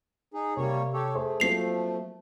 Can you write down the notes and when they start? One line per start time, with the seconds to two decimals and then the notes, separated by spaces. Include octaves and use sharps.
0.34 D#4 G#4
0.57 C3 G3 A#3 C#5
0.94 G4 A4 C#5
1.15 A3 G#4 C5 C6
1.40 F3 F#3 A3 A#3 C4 C7 F7